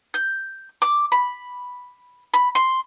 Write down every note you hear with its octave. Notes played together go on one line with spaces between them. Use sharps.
G6
D6
B5
B5
C6